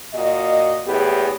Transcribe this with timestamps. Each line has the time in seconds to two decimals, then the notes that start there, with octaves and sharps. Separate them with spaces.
0.14 A#2 F#4 D#5
0.87 E2 A2 B3 G4 G#4